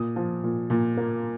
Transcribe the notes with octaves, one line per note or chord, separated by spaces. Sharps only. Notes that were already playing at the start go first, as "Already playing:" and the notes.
Already playing: A#2 D#6
F3
A#2
A#2
A#3